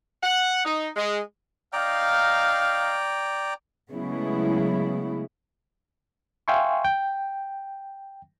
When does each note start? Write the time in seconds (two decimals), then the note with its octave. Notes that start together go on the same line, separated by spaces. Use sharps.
0.23 F#5
0.65 D#4
0.96 G#3
1.73 D#4 D5 F5 G5 A#5
3.91 C#3 F#3 G#3 A3 B3 E4
6.48 E5 F5 G5 G#5 C6 C#6
6.85 G5